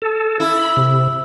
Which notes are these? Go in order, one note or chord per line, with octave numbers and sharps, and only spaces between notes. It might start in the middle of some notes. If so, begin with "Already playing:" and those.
A4
E4
B5
C3